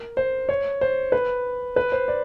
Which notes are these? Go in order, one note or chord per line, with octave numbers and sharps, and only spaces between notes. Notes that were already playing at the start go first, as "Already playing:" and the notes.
Already playing: A#4
C5
C#5
C5
B4
B4
C5
D5